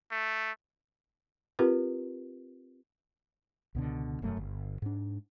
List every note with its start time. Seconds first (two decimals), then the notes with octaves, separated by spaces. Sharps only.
0.11 A3
1.59 C4 F4 G4 A#4 B4
3.75 C#2 B2 D3
4.22 E1 F#2 A3
4.37 G1
4.82 G#2 D4